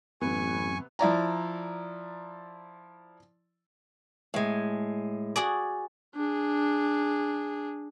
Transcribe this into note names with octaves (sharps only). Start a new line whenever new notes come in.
A1 F#2 C3 B3 G#5 C#6
F3 E4 D5 A#5
A2 G#3
F#4 G#4 D5
D4 G#4